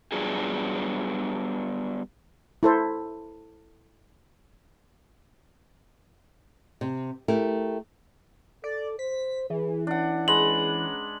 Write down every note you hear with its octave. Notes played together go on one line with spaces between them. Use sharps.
F#3 G3 B3 D4 F4 G#4
E4 A4 C5
C3
A3 E4 G4 A#4
A4 D5
C5 B6
E3 G#4
C#4 D4 F#5
G#3 B4 A#5 F#7